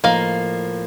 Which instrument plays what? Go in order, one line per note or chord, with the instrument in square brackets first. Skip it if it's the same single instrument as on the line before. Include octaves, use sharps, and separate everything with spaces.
[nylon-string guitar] A2 F3 [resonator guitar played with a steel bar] A#3 [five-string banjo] D#4 F5